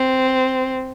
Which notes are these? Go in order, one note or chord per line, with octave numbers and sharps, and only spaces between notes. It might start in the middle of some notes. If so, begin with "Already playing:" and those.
Already playing: C4